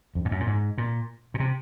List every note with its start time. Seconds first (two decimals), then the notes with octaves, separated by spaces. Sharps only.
0.15 F2
0.25 G#2
0.31 F#2
0.40 A#2
0.47 G#2
0.78 A#2
1.34 A#2
1.40 C3